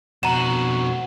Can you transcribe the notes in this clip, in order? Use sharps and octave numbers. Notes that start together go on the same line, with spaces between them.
F2 B2 F#4 A#5 E7